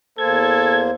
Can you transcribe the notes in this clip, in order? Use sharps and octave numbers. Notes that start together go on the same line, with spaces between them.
E2 A#3 A4 C5 G#6